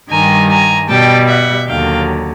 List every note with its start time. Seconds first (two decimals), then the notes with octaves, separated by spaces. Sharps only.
0.10 G2 D#3 G3 G#5 A#5
0.51 G#5 A#5
0.90 B2 G3 G5 A5
1.28 E5 F#5
1.68 D#2 D3 F#3 F5 G5